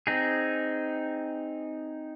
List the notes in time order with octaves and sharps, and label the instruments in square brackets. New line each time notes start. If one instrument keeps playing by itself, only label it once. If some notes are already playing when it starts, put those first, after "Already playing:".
[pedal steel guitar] C4 D#4 G#4